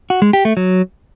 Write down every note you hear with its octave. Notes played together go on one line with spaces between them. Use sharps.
F#4
G#3
G4
A3
F#3